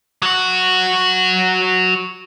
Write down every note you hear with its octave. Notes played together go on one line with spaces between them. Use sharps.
F#3 F#4